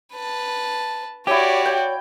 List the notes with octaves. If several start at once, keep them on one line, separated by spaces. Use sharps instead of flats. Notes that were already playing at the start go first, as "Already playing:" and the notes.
B4 A5
E4 F#4 G4 C#5 D5 G#5
C#5 G5